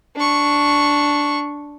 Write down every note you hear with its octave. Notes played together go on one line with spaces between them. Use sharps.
D4 C#6